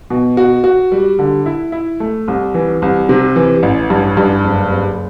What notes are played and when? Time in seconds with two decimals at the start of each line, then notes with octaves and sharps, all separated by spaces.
0.10 B2
0.37 F#4
0.64 F#4
0.92 G3
1.19 D3
1.46 E4
1.72 E4
2.00 A3
2.28 C2
2.54 E3
2.82 C2
3.09 C3
3.36 E3
3.63 A1
3.90 G2
4.17 G2
4.44 F#1
4.72 F#1